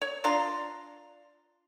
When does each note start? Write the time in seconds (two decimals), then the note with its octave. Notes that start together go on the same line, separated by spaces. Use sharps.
0.02 C#5
0.24 D4 F4 A#5 C6